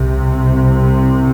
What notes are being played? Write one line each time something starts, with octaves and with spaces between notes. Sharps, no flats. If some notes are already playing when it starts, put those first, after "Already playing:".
Already playing: C2 C3